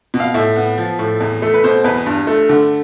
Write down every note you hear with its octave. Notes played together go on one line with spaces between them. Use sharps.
B2
F5
A2 E5
B3
F3
A2
E2
A3
B4
B2 C5
E2 B4
G2
A3
D3